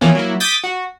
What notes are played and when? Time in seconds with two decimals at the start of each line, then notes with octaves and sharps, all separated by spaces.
0.01 E3 F3 A#3 B3 C#4
0.15 F#3 A#3 E4
0.40 D6 D#6 G6 A6 B6
0.64 F#4